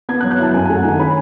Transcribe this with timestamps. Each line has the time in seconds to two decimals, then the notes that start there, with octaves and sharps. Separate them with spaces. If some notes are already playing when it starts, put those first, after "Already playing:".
0.09 B3 G#6
0.21 F#6
0.24 F#3
0.31 F#6
0.39 E4 A5
0.54 F#2 G#5
0.65 G#5
0.70 A3
0.77 F#5
0.85 D#3 G#5
1.00 C#4 B5